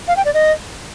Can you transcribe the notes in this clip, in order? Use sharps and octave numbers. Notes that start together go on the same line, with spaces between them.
F5
G5
D5
D#5